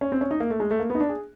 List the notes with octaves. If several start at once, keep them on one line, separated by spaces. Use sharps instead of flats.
C#4
C4
C#4
D#4
A#3
A3
G#3
A3
A#3
B3
D#4
D4
G#4